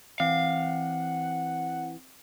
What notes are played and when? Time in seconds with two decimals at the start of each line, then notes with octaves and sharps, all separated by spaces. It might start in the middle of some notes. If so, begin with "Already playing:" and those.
0.20 E3 C4 F5 F#5